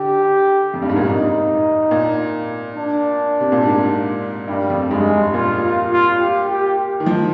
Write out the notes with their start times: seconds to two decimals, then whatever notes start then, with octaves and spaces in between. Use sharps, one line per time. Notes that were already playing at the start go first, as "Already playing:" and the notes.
Already playing: D3 G4
0.74 F2
0.82 G2
0.89 G#2
0.96 A#2
1.04 C3 D#4
1.91 A#2
2.76 D4
3.40 C3
3.52 A#2
3.63 G#2
4.48 G2 G3
4.70 F2
4.91 G2 G#3
5.13 G2
5.34 A#2 F4
5.63 F4
5.92 F4
6.20 G4
6.49 G4
6.78 G4
7.00 D#3
7.06 F3